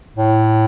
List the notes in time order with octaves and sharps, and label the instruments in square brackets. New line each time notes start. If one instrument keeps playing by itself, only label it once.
[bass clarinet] A2